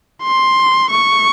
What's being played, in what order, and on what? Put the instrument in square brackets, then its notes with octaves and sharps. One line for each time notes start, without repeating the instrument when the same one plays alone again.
[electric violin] C6
C#6